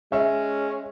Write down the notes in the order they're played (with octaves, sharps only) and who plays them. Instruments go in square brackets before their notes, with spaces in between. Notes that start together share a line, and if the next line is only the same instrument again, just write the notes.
[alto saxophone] G#3 [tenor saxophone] C#4 [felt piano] E5